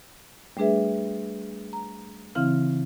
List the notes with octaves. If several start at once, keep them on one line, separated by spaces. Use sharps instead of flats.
G3 A3 D4 G#4 B4 E5
A#5
C#3 E3 C4 E4 F5 F6